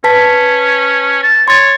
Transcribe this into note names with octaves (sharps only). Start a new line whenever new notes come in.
C#4 B4 A5 B6
A5
C#5 C6 A6